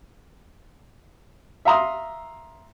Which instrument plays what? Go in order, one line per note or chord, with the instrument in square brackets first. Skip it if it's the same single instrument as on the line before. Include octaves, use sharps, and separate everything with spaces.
[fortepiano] E5 F5 A#5 C6 D#6